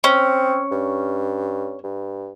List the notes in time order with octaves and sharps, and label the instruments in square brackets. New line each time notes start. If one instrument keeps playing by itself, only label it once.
[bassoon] C4 [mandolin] C#4
[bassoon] G2
G2